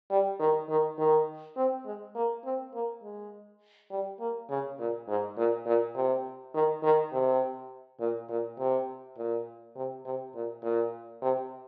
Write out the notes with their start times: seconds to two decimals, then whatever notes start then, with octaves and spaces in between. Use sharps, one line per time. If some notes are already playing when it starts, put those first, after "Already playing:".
0.10 G3
0.39 D#3
0.69 D#3
0.98 D#3
1.56 C4
1.85 G#3
2.15 A#3
2.44 C4
2.74 A#3
3.03 G#3
3.90 G3
4.20 A#3
4.49 C#3
4.79 A#2
5.08 G#2
5.37 A#2
5.66 A#2
5.95 C3
6.54 D#3
6.83 D#3
7.12 C3
8.00 A#2
8.29 A#2
8.59 C3
9.17 A#2
9.76 C3
10.05 C3
10.34 A#2
10.63 A#2
11.22 C3